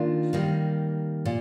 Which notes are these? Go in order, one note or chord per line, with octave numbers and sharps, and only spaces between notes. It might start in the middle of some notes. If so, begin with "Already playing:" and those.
Already playing: D#3 A#3 D4 F4
D#3 G3 A#3
A#2